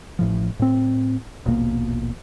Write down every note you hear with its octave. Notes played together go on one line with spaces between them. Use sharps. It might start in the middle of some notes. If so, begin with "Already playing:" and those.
A1 A2 F3
A2 C4
D#1 A#1 B2 A#3